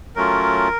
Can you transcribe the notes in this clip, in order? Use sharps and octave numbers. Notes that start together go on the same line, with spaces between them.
F#3 A3 C#4 F4 A#4